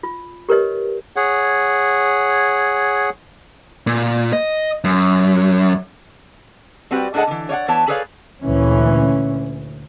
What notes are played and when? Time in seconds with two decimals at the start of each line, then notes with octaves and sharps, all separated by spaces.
0.03 F4
0.49 G4 A#4 B4 C#5 D#5
1.16 G#4 C#5 F#5
3.87 A#2
4.33 D#5
4.84 F#2
6.91 G3 C4 F#4 G4 B4
7.14 A2 D4 G#4 A4 D#5 F#5
7.27 D3 E3
7.49 C#5 D5 F5 F#5
7.68 E3 B3 C#5 A5
7.88 G#4 A4 B4 C#5 D5 F5
8.42 D2 A#2 E3 C#4